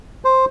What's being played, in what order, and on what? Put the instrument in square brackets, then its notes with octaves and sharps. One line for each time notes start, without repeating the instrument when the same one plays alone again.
[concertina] C5